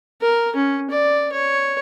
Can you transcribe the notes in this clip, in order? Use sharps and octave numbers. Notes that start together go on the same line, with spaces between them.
A#4
C#4
D5
C#5